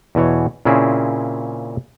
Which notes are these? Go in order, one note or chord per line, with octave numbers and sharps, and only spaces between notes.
E2 B2 E3 C#5
A#2 C#3 C4 C#4 E4 G#4